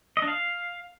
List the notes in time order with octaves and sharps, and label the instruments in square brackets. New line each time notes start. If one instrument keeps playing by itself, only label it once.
[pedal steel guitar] D#5
D4
F5